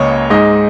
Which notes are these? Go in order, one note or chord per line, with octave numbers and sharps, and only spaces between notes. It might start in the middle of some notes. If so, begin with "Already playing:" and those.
Already playing: C#2 C#3 A#3 C#5 D#5
G#2 G#3 D#4 D#5